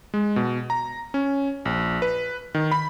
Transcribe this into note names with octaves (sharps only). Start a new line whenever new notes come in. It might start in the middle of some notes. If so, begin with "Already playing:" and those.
G#3
B2
A#5
C#4
A#1
B4
D#3
B5